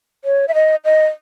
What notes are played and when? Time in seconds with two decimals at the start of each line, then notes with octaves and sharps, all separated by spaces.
0.25 C#5
0.48 E5
0.54 D#5
0.85 D#5